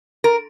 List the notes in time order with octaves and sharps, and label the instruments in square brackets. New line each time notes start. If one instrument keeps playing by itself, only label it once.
[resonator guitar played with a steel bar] A#4